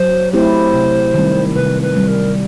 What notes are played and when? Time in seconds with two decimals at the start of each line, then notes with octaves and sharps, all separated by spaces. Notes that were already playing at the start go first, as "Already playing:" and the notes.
Already playing: F#3 C5
0.33 A3 C4 E4 G4 C5
0.74 C3
1.14 D#3 G3 C4
1.55 C3 B4
1.82 B4
1.95 D#3 G3 C4
2.08 A#4